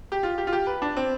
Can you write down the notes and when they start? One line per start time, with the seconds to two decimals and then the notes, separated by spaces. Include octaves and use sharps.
0.12 G4
0.23 F4
0.38 G4
0.47 F4
0.53 G4
0.67 B4
0.82 D4
0.97 C4